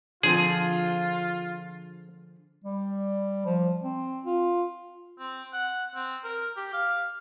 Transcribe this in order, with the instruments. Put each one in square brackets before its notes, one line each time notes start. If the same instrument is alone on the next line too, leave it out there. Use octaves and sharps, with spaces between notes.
[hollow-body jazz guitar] D3 F3 C4 [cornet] F4 [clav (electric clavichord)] G#4
[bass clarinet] G3
F3
C4
F4
[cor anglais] C4
F#5
C4
A#4
G4
F5